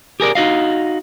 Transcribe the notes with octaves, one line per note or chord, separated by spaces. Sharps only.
G4 G#4 A#4 D5
D#4 F#4 D#5 F5